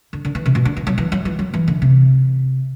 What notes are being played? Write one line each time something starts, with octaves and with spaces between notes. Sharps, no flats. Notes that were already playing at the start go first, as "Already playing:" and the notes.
D3
D3
E3
C3
B2
D3
E3
F#3
E3
F#3
E3
F#3
E3
D3
C3